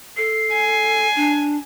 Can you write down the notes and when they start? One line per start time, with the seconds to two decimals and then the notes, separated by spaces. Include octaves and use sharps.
0.17 A4 C7
0.53 G#5
1.16 D4